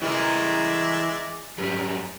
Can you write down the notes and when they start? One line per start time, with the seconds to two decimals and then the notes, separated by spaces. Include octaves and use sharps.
0.02 E3 G#3 A#4 D5 E5
1.58 F#2 G3